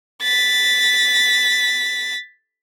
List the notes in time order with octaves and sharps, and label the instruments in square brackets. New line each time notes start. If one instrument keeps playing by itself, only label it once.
[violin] A6 B6